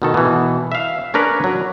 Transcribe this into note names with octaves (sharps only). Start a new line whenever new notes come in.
B2 D#3 A4
B2 E3
E5 F5
C#4 D4 A#4 B4 C#5
F#3